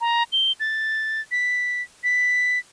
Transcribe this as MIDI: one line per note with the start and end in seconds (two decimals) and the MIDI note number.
0.01 0.23 82
0.32 0.52 103
0.60 1.21 93
1.32 1.82 95
2.04 2.59 95